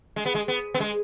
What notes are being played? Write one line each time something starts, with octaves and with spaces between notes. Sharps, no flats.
G#3
B3
G#3
B3
B3
G#3